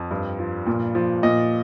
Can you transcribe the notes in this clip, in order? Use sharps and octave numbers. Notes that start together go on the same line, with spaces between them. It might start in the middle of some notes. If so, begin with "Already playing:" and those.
Already playing: F2
G2
F3
A#2
F3
A#2 D#5